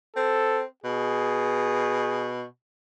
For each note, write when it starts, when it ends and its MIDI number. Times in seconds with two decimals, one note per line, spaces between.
0.16 0.64 60
0.16 0.63 69
0.84 2.44 47
0.84 2.35 68